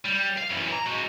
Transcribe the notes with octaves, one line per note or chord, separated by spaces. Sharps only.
G3
F5
F#2 E3
A#5
G#3 F#4